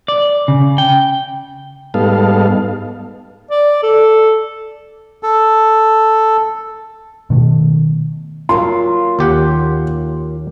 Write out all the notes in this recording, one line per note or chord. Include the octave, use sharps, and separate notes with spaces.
D5
C#3
G5
G#2 G3 B3 D#4 A4 F5
D5
A4
A4
B2 D#3 A3
F#3 A#3 F4 C6
D#2 G4 F#5